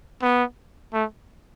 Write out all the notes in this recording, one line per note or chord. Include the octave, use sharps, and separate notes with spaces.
B3
A3